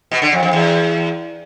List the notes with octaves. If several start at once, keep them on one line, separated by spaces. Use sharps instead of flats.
B2
D3
F2
F2
E2